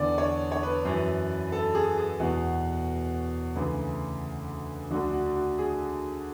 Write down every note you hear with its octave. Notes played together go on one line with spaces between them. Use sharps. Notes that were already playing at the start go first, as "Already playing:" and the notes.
Already playing: E2 D3 D5
C#5
C#5
B4
F#2 E3
A4
G#4
G#4
E2 B2 F#4
D2 C#3 E3
D2 D3 F#4
F#4
F#4
G#4